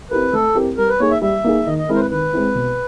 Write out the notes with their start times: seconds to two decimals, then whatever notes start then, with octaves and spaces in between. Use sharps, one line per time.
0.11 C4 E4 G4 A#4 B4
0.33 A3 A4
0.55 C4 E4 G4 A#4
0.77 G3 A#4
0.89 B4
1.00 A#3 D#4 G#4 C#5
1.11 E5
1.22 G3 E5
1.44 A#3 D#4 G#4
1.66 D#3 D#5
1.78 D#5
1.88 G#3 C4 E4 A#4
1.95 C5
2.00 B4
2.10 D#3 B4
2.33 G#3 C4 E4
2.55 B2